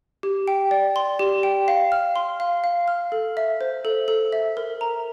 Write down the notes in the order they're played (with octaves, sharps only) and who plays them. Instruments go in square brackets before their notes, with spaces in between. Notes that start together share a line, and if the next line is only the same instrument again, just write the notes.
[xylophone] G4
G5
D5
C6
G4
G5
F5
F6
C6
F5
F5
F6
A4
E5
C5
A4
A4
E5
A#4
A#5